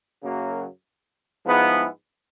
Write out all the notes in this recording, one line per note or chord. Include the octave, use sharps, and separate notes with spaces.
F#2 C#3 F#3 A#3
G#2 F3 G#3 B3 E4